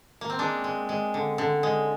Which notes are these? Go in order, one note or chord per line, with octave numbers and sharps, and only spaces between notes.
A#3
C4
G#3 D4
G#3
G#3
D3
D3
G#3